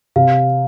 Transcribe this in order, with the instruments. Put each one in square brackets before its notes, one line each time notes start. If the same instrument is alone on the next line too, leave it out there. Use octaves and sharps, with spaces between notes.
[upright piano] C3 [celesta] F5